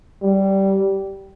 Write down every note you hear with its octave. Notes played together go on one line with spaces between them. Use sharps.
G3